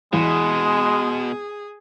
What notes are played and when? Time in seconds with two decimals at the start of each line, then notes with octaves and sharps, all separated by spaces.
0.13 E2 B2 G#3 G#4